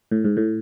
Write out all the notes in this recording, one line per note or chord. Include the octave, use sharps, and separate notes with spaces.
A2
G#2
A2